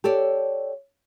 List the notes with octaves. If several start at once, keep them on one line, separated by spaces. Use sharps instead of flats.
G4 A4 C#5 D5